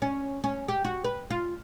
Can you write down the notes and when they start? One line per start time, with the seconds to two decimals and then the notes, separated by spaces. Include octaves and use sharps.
0.02 C#4
0.44 C#4
0.68 G4
0.85 F#4
1.04 B4
1.30 F4